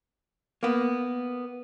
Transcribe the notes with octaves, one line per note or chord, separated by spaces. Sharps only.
A#3 B3